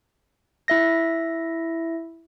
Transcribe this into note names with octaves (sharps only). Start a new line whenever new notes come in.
E4 E5 A#6